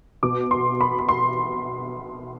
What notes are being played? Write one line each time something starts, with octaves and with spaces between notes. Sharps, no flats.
B2 D6
C6
B5
B5
C6